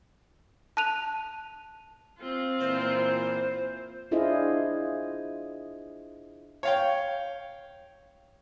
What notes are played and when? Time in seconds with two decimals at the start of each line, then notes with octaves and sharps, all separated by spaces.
0.77 A5 F#6 D#7 F7
2.19 C4 F4
2.60 A#2 E3 C5
4.11 D4 E4 F4 G#4 C5 D#5
6.63 C#5 F5 G5